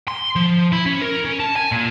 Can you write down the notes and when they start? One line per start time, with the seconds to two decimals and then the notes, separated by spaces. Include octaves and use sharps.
0.08 C6
0.36 F3
0.72 E4
0.86 C#4
1.01 A#4
1.25 C#4
1.40 A5
1.56 G#5
1.72 A#2